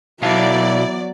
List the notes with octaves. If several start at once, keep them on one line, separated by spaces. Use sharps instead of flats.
B2 F#3 B3 E4 D5 F5 A5